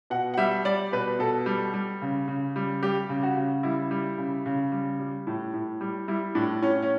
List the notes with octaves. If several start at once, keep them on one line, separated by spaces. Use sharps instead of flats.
B2 F#5
F#5
G3 E5
G3 D5
B2 B4
B2 A4
G3
G3
C#3
C#3
G3
G3 G4
C#3
F#4
C#3
G3 E4
G3
C#3
C#3
G3
G3
A2
A2
G3
G3 E4
A2 D4
A2 C#4
C#4